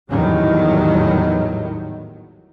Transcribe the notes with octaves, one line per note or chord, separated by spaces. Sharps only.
G#1 E2 A2 D#3 F#3 G3